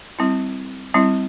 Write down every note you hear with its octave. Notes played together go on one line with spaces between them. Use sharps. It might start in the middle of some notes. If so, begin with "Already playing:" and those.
G3 C4 E4
G3 C4 E4